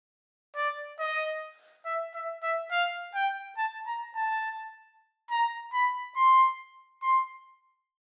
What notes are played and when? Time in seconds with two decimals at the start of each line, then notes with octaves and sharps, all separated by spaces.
0.56 D5
0.99 D#5
1.86 E5
2.15 E5
2.43 E5
2.72 F5
3.15 G5
3.58 A5
3.87 A#5
4.15 A5
5.30 A#5
5.73 B5
6.16 C6
7.02 C6